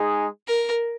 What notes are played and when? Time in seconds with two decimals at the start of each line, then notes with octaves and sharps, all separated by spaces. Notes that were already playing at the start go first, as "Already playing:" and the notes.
Already playing: G#3 D#4 G#4
0.48 A#4